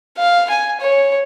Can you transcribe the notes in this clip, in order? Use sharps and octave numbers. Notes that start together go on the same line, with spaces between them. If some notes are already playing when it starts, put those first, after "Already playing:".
F5
G#5
C#5